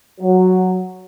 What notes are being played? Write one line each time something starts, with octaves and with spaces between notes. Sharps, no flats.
F#3